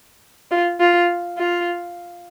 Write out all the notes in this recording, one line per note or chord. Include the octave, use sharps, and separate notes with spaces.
F4
F4
F4